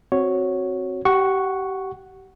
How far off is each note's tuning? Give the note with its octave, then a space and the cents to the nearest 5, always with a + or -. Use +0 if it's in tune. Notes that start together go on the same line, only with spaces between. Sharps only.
C4 +5 F#4 +0 C#5 +0
G4 -30 F#5 +0 C#6 +0